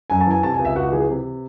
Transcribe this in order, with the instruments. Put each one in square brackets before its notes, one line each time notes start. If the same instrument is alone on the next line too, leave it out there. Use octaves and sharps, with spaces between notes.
[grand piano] F#2 G#5
A5
E3 G#5
C3 A5
G#5
C#2
E5
C#2 F#4
E3 G#4
C3